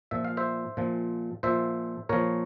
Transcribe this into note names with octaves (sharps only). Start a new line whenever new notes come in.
A#2 F3 E5
F5
C5 E5
A#2 F3
A#2 F3 C5 E5
A#2 F3 A#4 C#5